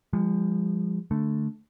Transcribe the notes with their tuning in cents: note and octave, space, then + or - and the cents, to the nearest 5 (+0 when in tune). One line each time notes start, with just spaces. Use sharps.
F3 +0 G#3 -40
D3 +0 A3 +0